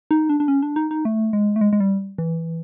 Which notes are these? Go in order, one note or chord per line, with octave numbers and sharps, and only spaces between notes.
D#4
D4
D4
C#4
D4
D#4
D#4
A3
G#3
A3
G#3
G#3
G3
E3